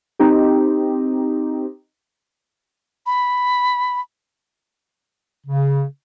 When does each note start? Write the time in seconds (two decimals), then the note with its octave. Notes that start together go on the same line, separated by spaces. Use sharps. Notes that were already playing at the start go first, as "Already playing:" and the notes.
0.19 C4 D#4 G4
3.06 B5
5.47 C#3